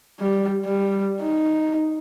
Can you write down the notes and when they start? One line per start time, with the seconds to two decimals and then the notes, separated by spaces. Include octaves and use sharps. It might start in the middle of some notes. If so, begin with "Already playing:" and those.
0.20 G3
0.65 G3
1.21 D#4